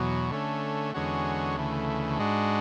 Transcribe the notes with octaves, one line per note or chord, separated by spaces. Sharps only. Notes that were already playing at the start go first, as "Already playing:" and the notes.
Already playing: E2 B2 F#3
D3 A3 C#4
E2 D3 G#3 C#4 F#4
D2 C#3 E3 A3
G#2 G#3 D4 F#4